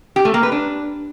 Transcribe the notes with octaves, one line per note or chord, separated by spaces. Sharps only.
G4
A3
A#3
B4
D4